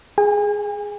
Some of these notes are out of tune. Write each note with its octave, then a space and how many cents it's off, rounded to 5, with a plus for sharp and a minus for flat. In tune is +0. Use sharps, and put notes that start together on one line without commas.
G#4 +0 G#5 -40